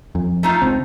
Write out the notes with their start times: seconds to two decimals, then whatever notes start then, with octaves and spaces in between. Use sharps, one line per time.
0.15 F2
0.43 A3 D#4 F4
0.62 C#2 C4